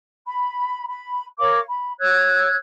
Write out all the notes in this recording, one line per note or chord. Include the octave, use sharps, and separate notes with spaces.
B5
B5
A#4 C#5 F5 D6
B5
C#5 E6 F#6 G#6